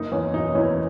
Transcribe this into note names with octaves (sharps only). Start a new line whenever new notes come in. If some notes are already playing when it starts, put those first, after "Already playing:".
Already playing: F#1 D#4
E2 C#4
B2 D#4
E2 C#4 E4